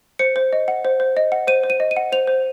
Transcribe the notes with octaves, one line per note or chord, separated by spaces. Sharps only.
C5 C#7
C5
D#5
F#5
C5
C5
D#5
F#5
C5 D#7
C5
D#7
D#5
D#7
F#5
C5 F7
C5